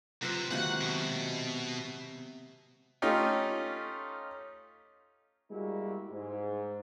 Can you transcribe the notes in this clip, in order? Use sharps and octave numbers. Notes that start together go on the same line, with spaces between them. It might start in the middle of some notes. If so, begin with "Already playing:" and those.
C3 F#3 F4 B4 C5
C3 D#3 G#3 A#3 F#4 F#5
B2
A3 C#4 D#4 F4 G4
G3 G#3 A#3 E4 F#4 G4
G#2